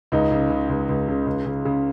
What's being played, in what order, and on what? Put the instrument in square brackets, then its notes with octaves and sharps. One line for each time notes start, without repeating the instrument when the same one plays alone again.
[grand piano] C#2 D#4
C#3
C#3
C#2
C#2
C#3
C#2
C#3
C#3